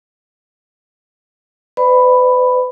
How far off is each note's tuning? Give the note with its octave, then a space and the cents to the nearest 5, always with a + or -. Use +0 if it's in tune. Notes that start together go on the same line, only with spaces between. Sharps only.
B4 +40 D5 +20 B5 +5